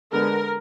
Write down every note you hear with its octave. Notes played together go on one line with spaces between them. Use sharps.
D3 G#3 B3 A#4